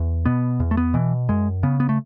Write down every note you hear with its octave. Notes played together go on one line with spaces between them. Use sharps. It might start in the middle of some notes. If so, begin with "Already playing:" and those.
Already playing: E2
B2 B3
E2
A3
B3
B2 E3
F#2 G#3
C#3 B3
B3
A3